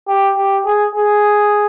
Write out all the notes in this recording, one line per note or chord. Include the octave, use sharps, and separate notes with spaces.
G4
G4
G#4
G#4